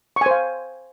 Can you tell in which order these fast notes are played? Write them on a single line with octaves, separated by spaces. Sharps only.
C#6 G#5 C5 F5